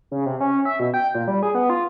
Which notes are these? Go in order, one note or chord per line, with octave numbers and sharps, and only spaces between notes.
C#3
C3
C#4
E5
B2
G5
A#2
G3
G#4
B3
F4